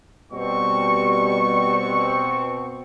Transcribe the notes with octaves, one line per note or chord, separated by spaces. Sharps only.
B2 G3 C4 C#6